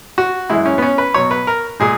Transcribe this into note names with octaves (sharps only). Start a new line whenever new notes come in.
F#4
F#2 E3 G#3 E4
C#4
B3
C#4
B4
B2 F#3 C#5
B4
A#4
A#2 G#3 G#4